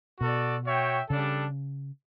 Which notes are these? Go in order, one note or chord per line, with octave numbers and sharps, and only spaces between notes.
B2 F#4 A4 D5
F#4 C#5 E5 G5
C#3 G3 D4 A4